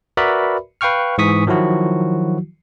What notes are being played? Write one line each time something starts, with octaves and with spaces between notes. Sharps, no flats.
F#4 A#4 B4 D5 E5 B5
B4 F5 G5 C#6 F6
G#2 E3 C#6 D#6 B6
D#3 F3 F#3 E4 F#4